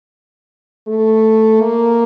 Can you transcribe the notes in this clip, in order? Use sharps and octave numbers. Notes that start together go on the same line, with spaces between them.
A3
A#3